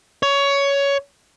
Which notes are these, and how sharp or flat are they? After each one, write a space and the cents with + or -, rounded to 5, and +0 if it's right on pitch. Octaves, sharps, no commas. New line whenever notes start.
C#5 +15